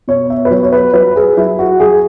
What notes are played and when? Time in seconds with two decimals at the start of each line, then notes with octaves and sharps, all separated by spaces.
0.08 B2 C#5
0.30 E5
0.45 B4
0.51 F#3 C#5
0.63 C#5
0.72 B4
0.94 F#3 B4
1.16 G#4
1.37 F#3 E4
1.59 F#4
1.80 F#3 G#4